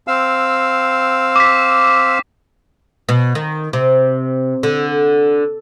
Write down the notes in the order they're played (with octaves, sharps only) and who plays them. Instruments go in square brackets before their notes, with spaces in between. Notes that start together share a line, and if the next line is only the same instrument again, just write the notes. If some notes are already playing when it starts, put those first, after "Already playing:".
[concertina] C4 F5 E6
[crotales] D6 B6
[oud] B2
D#3
C3
D3